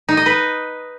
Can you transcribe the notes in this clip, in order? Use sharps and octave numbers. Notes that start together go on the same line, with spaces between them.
D#4
D#5
B4